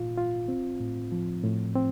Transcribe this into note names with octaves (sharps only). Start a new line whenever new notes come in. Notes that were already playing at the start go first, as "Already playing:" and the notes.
Already playing: A#2 F4
F4
C4
A2
F3
A2
C4